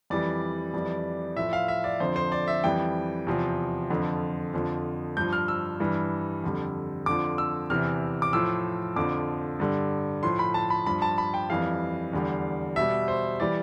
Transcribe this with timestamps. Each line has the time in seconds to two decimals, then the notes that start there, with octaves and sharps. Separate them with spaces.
0.10 F2 E3 G3 D5
0.74 F2 E3 G3
1.37 A2 F3 E5
1.53 F5
1.68 E5
1.84 D5
2.00 F2 D3 F3 C5
2.16 C5
2.32 D5
2.48 E5
2.64 F2 E3 G3 G5
3.27 E2 C3 F3
3.90 F2 D3 F3
4.54 F2 D3 F3
5.17 G2 F3 G6
5.33 F6
5.48 E6
5.80 G2 E3 G3
6.44 F2 D3 G3
7.06 F2 D3 F3 D6
7.38 E6
7.70 E2 C3 E3 F6
8.22 D6
8.33 A2 F3 E6
8.96 F2 D3 F3 D6
9.60 G2 D3 G3
10.23 A2 F3 C6
10.39 B5
10.54 A5
10.70 B5
10.86 G2 F3 B5
11.02 A5
11.18 B5
11.34 G5
11.49 F2 E3 G3 F5
12.13 E2 D3 G3
12.76 B2 G3 E5
13.08 C5
13.40 E3 G3 D5